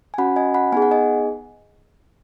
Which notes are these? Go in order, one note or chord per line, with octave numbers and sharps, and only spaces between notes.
G#5
C#4 F#4 F#5 B5
D#5 G#5
F#5 B5
B3 D#4 G#4 G#5
F#5
D#5 G#5